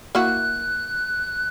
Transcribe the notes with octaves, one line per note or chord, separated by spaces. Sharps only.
A#3 E4 F#4 F#6